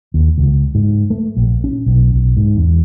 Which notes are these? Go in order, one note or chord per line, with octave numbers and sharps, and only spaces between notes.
D#2
C#2
G#2
A3
A#1
C#4
B1
B1
G#2
E2